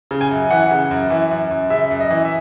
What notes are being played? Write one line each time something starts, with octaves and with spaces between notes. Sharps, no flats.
C#3
G#5
F#2
E3 F#5
C#3
F#2
E3
F#2
F#2
C#3 E5
F#2
D#5
E3
E5